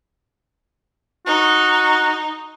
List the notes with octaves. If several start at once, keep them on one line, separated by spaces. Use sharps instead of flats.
D#4 F#4